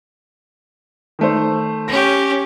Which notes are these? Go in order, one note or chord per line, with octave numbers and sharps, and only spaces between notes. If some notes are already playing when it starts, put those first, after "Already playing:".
D#3 A3 C5
C#4 G4 A#6